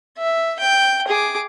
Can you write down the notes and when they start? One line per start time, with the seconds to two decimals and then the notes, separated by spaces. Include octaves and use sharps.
0.18 E5
0.59 G5
1.07 G#4 D6